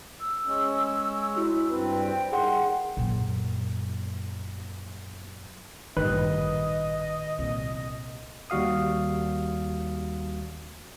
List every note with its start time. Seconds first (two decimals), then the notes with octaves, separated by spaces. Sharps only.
0.20 E6
0.46 G#3 C#4
1.36 E4 F#4
1.70 G2 C4 B4
1.99 G5
2.32 D#3 G3 G#4 F#5 G5 C6
2.97 F#2 A#2
5.97 A1 G2 A#2 D#3 B4 D#5 F#6
7.39 C2 A#2
8.50 D#2 G3 F#4 F5 D#6